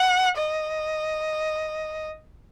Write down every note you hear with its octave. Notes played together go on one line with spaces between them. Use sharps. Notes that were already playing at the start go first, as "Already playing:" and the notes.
Already playing: F#5
D#5